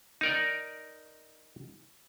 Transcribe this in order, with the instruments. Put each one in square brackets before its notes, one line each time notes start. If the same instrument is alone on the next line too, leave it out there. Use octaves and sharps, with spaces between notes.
[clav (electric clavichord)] D#4 A#4 D5